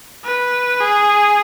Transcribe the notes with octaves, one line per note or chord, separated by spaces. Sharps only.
B4
G#4